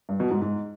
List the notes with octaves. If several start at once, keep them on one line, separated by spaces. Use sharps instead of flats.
G2
B2
G#2
G#2